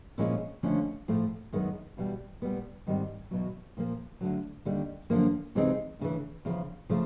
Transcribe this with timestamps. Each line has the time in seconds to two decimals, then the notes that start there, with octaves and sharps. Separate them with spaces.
0.18 A#2 F3 G#3 C#4 E4
0.63 D#2 D3 F3 A3 C#4
1.08 A2 F3 A3
1.53 F#2 D#3 G#3 B3
1.97 E2 B2 G3
2.42 A#2 G3 B3
2.87 G#2 D#3 G3 C4
3.31 E2 B2 F#3
3.77 A#2 F3 A#3
4.21 D2 D3 F#3
4.65 D#2 D3 G3
5.10 F#2 D3 F3 A#3
5.55 C3 E3 G#3 C4 D#4
5.99 D2 C#3 E3
6.45 E2 C#3 F3
6.89 C#3 F3 A3